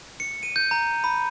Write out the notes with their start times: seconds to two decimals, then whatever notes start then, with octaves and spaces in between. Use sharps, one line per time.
0.20 C#7
0.43 D#7
0.56 G6
0.71 A#5
1.04 B5